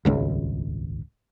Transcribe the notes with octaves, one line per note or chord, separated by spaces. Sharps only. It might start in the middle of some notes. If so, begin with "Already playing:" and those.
D#1 G#1 C#2